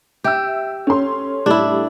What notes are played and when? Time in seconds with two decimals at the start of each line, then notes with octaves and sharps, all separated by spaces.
0.24 G4 E5 E6
0.87 C#4 A4 C6
1.46 A2 G3 A3 D4 E4